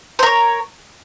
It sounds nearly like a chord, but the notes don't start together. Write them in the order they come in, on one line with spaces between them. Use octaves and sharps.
C5 A#4 C#5